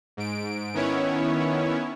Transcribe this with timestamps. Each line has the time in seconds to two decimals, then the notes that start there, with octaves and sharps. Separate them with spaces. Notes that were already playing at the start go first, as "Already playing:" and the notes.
0.17 G#2 D7
0.74 D#3 B3 C#4 E4 C#5